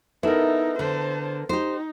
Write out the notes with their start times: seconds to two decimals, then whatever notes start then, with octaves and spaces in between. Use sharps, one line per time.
0.23 B3 D#4 E4 A4 A#4
0.79 D3 C5 A5
1.49 D#4 G4 C5